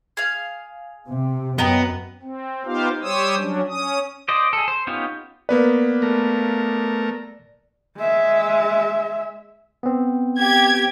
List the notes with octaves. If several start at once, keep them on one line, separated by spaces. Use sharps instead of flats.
G#4 F5
C3
F#2 B3 D#5 G5 A#5
C4
B3 D#4 F4 G4 C5 F5
G3 G4 C5 C#5 D#6 E6
F#3 C#4 D4
C#4 D#6
C5 D5 D#5
G#4 A4
C5
B3 C#4 D#4 F4 G4
A#3 B3 B4 D5
A3 A#4
G#3 E5
B3 C4
G4 G#6